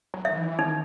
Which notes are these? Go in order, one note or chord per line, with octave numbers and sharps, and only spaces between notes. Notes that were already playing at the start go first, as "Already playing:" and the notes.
F#3
D#3 E5
E3
D#3 D#4